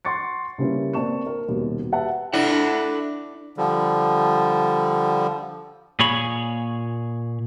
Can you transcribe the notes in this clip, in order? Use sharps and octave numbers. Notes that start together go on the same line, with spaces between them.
F#5 C6 C#6 A6 C#7
C#3 G3 A#3 C#4 E4 B4
A#3 C4 D5 A5 C#6 E7
A#4
D#1 D#2 B2
G4 B4 E5 F#5 A5
D4 E4 A4 E5 F#5
D3 F3 G3
A#2 G#4 C#5 B5